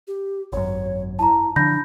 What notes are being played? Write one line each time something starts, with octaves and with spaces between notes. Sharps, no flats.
G4
G#1 F#2 C#5
E4 A5 A#5
D3 F3 D4 B5 G6 A#6